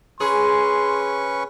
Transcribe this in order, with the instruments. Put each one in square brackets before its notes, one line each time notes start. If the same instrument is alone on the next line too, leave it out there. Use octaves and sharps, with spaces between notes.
[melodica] C#4 B4 C#6 [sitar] G#4 [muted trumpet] C6